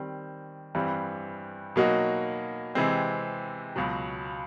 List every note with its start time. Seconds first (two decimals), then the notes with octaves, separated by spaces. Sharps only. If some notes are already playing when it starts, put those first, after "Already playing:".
Already playing: D#3 G3 C4
0.75 G2 E3 G3 C4
1.76 B2 F#3 A#3 D#4 F#4
2.75 C3 E3 G#3 C4
3.76 C#2 B2 F#3